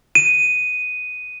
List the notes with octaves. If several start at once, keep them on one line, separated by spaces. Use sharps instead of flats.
D#7